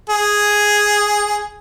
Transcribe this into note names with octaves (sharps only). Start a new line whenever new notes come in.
G#4